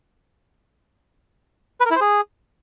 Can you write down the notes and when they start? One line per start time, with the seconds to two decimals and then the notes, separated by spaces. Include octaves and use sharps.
1.80 B4
1.86 A#4
1.91 E4
1.96 C5
2.01 G#4